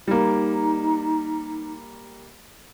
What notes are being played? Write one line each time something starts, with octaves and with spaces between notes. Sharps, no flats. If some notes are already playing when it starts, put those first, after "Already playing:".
G3 A#3 D#4